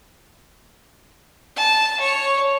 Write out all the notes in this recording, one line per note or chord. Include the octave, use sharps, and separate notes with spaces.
A5
C#5